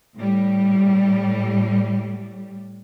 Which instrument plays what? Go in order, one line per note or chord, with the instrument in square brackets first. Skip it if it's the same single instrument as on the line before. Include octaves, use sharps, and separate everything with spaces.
[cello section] A2 G3